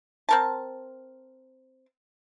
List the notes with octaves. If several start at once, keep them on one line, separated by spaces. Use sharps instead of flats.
C4 A#4 A5